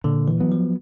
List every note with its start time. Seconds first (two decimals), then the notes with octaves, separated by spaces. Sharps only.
0.04 A#2 D3
0.28 E3
0.40 F#3 B3
0.52 F3